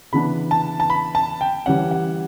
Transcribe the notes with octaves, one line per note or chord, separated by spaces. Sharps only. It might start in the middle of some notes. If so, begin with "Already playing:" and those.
C#3 E3 B3 D4 B5
A5
A5
B5
A5
G5
E3 G3 C#4 F#5
F#5